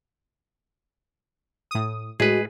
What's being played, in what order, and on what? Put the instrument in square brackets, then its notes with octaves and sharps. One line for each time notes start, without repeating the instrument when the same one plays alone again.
[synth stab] A2 D#6
[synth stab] A2 [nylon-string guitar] G#3 [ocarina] F#4 [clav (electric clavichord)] G#4 B4